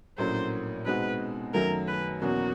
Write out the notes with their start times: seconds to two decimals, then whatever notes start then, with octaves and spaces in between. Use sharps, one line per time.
0.18 A#1 A2 F#3 A#3 C#4 C5
0.86 B2 G#3 C4 D#4 F#4 B4
1.54 F#2 D#3 F#3 A3 C#4 A#4
1.88 B4
2.22 E2 B2 F#3 A#3 C#4 F#4